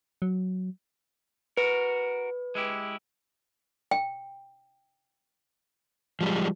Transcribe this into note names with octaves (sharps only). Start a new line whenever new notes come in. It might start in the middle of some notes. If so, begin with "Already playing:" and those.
F#3
F#4 A#4 B4
G#3 E4 G4
G5
F3 G3 G#3